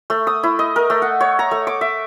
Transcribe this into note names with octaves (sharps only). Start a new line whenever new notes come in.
A3
D#6
E4
D#5
A#4
A3
F#5
C#5
A#5
A3
D6
E5